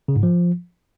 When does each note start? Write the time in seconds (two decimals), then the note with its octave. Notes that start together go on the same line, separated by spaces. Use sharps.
0.08 C#3
0.16 G#2
0.23 F3